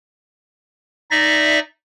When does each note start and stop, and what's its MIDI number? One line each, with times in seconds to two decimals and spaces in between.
1.11 1.59 63
1.11 1.59 74
1.11 1.59 76
1.11 1.59 94